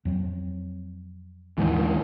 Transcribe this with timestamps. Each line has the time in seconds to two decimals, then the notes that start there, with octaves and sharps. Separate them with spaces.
0.05 F2 F#3 C4
1.58 D#2 G#2 E3